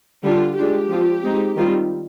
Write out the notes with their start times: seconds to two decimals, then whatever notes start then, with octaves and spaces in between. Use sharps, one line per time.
0.23 D3 G3 D4 F4
0.56 G#3 D4 F4 G4
0.89 F3 C4 F4
1.23 G#3 C4 D#4
1.57 D#3 G3 C4 F4